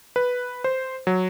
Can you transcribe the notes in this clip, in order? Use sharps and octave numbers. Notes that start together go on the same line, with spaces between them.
B4
C5
F#3